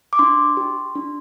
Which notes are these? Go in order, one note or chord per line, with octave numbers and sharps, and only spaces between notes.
D6
D4 C6
G4
D4